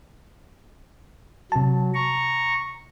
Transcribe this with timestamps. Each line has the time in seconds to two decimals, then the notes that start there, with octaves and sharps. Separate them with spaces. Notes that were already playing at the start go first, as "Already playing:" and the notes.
1.52 C3 F#3 A5
1.94 A#5 C#6